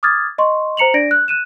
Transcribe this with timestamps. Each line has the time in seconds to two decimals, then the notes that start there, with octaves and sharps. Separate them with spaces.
0.03 D6 D#6 F6 G#6 A6
0.38 D#5 C6 C#6
0.77 C5 A#5 C#7 F7 F#7
0.94 D4 D5 A#6 D7
1.11 F#6
1.28 F#6 D#7 E7